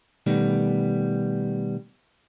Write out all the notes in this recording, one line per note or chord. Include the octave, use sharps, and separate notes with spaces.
B2 D#3 G3 A3 B3